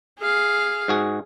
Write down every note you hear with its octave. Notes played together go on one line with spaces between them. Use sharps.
G#4 F5
G#2 F#4 G#4